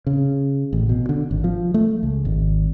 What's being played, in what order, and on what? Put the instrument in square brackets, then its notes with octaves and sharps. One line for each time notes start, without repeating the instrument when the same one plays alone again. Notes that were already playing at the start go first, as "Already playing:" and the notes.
[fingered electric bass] C#3
A1
B2
D3
G#1
F3
A3
C#2
G#1